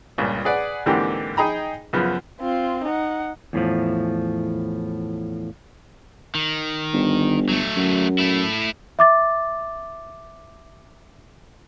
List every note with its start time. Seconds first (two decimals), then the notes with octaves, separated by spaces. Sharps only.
0.18 C#2 G2 A#2
0.45 G#4 B4 D5 F#5
0.86 G#2 D3 E3 A#3 C4 G4
1.37 D#4 G#4 D#5 G5 A#5 B5
1.93 F#2 C#3 F3 B3
2.41 C4 F4
2.84 D#4 F#5
3.53 E2 A2 F3
6.35 D#3
6.93 G1
7.49 F#3 A3
7.77 F#2
8.19 A3 E4
8.99 E5 D6 A6